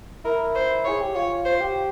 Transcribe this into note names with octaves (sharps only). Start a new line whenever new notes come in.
E4 A#4
C5
G#4 C#5
G4
F4 C#5
C5
G4